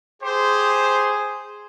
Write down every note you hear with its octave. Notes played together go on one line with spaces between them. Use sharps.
G4 G#4 C5